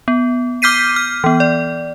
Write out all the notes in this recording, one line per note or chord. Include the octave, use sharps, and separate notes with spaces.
B3
D6 F6 G6 B6 C7 D#7
F6
E3 B3
D5